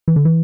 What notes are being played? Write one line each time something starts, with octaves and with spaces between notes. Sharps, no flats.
E3
D3
E3